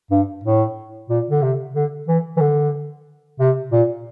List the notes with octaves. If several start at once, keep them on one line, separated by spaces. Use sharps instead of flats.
G2
A2
A#2
D3
C3
D3
E3
E3
D3
C3
A#2